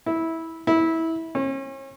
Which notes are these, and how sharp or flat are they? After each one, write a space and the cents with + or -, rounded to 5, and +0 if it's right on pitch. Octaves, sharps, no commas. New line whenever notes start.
E4 -15
E4 -20
C#4 -40